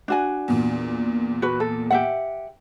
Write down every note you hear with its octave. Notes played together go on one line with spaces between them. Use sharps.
D4 F#4 G#5
E2 A#2
F#4 B4
A4
G4 E5 F#5